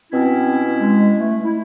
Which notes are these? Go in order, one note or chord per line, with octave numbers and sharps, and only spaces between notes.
B2 C4 C#4 E4
G#3
A3
E4